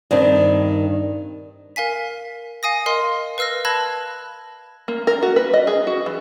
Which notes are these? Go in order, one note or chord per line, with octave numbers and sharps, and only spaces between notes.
G2 D#3 C4 D4
A#4 F5 G#5 B6
F5 G#5 D#6 A#6
A#4 D#5 F5 C6
B4 F5 E6 F6 A#6
A5 B5 E6 F#6 G#6 A#6
A#3
A#4
F#4
B4
D#5
G#4
F#4
E3